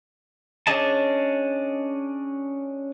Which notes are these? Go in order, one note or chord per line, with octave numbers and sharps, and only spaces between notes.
C#4 D4 G#4 D#5 A5